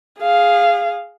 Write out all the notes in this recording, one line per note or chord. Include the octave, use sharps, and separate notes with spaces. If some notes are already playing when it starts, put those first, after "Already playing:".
G#4 F5